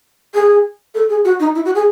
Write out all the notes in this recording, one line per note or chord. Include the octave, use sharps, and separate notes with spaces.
G#4
A4
G#4
F#4
D#4
E4
F#4
G#4